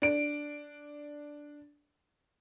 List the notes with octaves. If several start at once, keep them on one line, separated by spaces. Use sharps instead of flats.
D4 D7